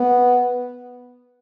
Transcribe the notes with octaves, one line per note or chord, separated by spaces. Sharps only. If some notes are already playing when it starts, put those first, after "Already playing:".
Already playing: B3